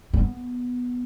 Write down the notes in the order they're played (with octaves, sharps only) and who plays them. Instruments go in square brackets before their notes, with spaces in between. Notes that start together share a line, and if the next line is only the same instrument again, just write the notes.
[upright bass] B3